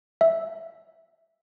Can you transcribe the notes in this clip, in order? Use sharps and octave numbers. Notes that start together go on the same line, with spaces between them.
E5